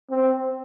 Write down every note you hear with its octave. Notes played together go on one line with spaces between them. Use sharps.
C4